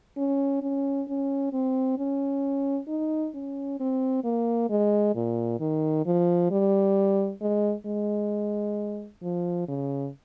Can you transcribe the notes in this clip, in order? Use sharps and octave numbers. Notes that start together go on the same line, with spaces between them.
C#4
C#4
C#4
C4
C#4
D#4
C#4
C4
A#3
G#3
A#2
D#3
F3
G3
G#3
G#3
F3
C#3